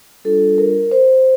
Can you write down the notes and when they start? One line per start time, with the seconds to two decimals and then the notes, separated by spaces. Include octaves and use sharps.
0.25 G3 D4 F4 A4
0.58 A#4
0.91 C5